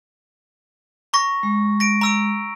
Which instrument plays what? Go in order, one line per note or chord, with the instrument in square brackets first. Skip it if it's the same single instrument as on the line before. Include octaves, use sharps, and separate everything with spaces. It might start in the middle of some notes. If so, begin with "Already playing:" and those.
[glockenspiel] A#5 C#6 A#6
[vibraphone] G#3
[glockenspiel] A#6 D7
A#5 E6 D7